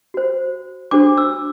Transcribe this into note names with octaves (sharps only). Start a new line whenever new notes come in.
F#4 C5
D4 F#4 A4 C5 D6
E6